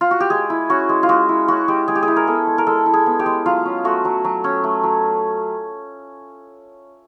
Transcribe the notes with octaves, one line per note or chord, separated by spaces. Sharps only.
F4
F#4
G4
G#3 G#4
E4
C#4 F#4
G#3
F4
G#3 F#4
E4
C#4 F#4
G#3 G4
G#3 G#4
G4
G#4
E4
A#4
B3 A4
G#3
A#4
G#3 A4
E4
G#4
B3
G4
G#3
F#3 F4
C#4
A3 F#4
F#3
F#3
C#4
A3
F#3